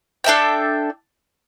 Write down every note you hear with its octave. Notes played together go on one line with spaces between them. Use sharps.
D4 A4 E5 G5